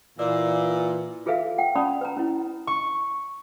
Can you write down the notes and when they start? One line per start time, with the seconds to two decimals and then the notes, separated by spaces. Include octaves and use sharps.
0.19 A#2 E3 B4 D5 E6
1.26 F4 G#4 A4 B4 E5 F5
1.58 F#5 G5
1.76 C#4 D5 A5 B5 C#6 D#6
2.01 B4 A#5
2.17 C#4 E4
2.67 C#6